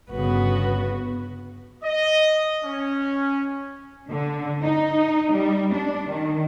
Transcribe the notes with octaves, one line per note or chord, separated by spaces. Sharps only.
G1 C#3 B3 F#4 B4
D#5
C#4
D3
D#4
G3
D4
D#3